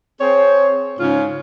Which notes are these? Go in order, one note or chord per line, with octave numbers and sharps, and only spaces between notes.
C4 G#4 C5 C#5
G#2 C#3 C#4 F4